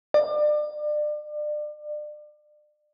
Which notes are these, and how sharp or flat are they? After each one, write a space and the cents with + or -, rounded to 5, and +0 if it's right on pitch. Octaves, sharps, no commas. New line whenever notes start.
D5 +30